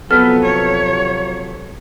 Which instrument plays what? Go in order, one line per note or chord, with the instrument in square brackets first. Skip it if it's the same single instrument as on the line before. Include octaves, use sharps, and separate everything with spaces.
[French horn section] C3 F3 F#3 [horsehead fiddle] B3 [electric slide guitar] A4 B4 [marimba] F6
[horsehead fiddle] C#5